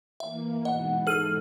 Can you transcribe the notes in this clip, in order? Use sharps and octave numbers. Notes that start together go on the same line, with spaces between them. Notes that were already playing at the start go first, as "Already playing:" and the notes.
E3 A#3 E5
G#2 B2 E3 D#5 F#5
G#4 A4 F6 D#7